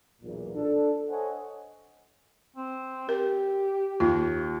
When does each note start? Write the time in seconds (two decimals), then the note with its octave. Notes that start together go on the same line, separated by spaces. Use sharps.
0.22 B1 E2 A#2
0.54 D4 A4
1.09 A4 C5 C#5 D#5 F#5 G#5
2.56 C4
3.09 G4 A#4
4.00 D#2 F4